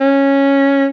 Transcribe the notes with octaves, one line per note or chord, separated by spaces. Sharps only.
C#4